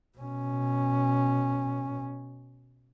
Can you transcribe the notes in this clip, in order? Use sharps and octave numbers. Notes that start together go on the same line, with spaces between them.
B2 C#4